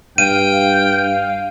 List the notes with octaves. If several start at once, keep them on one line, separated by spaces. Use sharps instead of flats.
G2 F5 G5 D#7